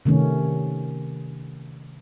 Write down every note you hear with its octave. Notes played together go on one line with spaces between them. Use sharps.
C3 D#3 A3 C#4